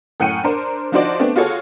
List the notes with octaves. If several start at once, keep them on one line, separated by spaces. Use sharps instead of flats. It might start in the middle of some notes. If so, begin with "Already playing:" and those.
F#2 A2 F#5 G5 C#7 D#7
D4 A#4 C5
F3 D4 D#4 F#4 C5 D5
A3 B3 C4 D4
F4 F#4 G#4 A4 C#5